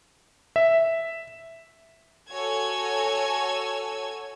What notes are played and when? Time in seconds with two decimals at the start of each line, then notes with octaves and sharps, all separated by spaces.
0.56 E5
2.31 F#4 A4 C#5 G#5 E6 G#6